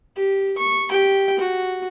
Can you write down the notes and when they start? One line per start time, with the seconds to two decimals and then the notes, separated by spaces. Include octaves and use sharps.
0.16 G4
0.58 C#6
0.91 G4 G5
1.39 F#4